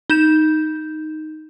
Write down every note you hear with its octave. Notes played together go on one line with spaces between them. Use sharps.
D#4 G6 E7